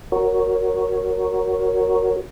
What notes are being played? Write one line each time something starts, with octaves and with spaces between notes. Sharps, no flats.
F#4 A#4 C#5